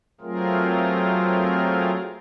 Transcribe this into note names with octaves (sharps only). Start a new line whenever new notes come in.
F#3 A3 C4 F4 G#4 A#4